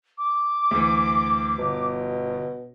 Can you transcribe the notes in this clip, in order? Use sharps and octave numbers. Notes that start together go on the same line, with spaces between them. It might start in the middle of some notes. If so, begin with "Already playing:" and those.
D6
D2 E3
G1 B2